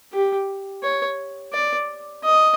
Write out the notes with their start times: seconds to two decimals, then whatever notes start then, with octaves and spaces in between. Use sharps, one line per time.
0.13 G4
0.83 C#5
1.53 D5
2.24 D#5